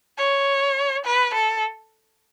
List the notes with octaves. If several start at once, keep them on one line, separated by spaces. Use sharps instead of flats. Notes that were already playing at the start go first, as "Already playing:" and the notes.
C#5
B4
A4